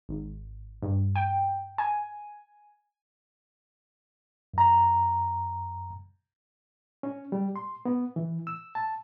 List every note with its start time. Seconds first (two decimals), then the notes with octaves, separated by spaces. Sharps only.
0.09 G#1
0.82 G2
1.16 G5
1.78 G#5
4.54 F#2 A#5
7.03 C#4
7.32 G3
7.56 C6
7.85 B3
8.16 E3
8.47 E6
8.75 A5